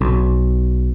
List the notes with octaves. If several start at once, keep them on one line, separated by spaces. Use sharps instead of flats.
B1